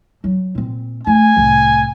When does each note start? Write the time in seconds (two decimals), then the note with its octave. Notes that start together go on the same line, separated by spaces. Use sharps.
0.24 F#3
0.55 A#2 C4
1.07 A3 G#5
1.37 C2 A2